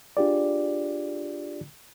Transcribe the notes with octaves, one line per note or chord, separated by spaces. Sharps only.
D4 F4 G4 G#4 D5